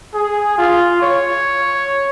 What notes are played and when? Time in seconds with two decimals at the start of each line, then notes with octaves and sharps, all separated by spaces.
0.14 G#4
0.58 F4
1.02 C#5